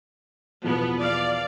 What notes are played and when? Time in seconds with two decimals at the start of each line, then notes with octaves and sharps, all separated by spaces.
0.64 E2 B2 F3 B3
1.01 D5 F5